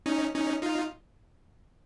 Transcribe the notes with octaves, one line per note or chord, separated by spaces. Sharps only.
C#4 D#4
C#4 D#4
D#4 F4